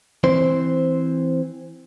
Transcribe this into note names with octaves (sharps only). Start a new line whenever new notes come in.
E3 C4 C5